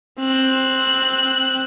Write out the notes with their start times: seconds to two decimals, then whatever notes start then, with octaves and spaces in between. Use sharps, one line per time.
0.20 C4 F#6